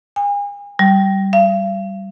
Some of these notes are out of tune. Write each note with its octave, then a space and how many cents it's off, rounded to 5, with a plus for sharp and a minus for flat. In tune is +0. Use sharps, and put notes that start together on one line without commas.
G#5 -40
G3 -15
F5 -40